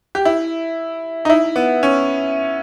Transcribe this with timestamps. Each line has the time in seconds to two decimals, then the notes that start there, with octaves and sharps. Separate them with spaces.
0.15 G4
0.25 E4
1.25 D#4
1.30 E4
1.56 B3
1.83 C#4